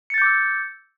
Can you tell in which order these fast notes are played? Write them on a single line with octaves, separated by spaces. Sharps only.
C#7 A6 G6 D6 E6